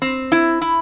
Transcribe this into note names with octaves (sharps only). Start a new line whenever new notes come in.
C4
E4
E4